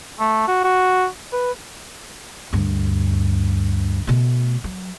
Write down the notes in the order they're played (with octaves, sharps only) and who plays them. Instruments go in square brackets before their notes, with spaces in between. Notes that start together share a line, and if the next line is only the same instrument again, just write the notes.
[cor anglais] A3
F#4
F#4
B4
[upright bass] D2 G2
B2 A3
F#3